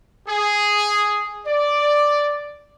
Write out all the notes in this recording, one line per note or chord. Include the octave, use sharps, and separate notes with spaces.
G#4
D5